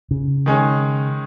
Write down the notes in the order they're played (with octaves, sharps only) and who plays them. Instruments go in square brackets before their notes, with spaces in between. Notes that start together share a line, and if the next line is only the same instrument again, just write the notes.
[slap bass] C#3
[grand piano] D#3 G#3 C#4